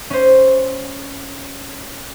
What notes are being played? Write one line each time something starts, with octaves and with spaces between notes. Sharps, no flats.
C#4 C5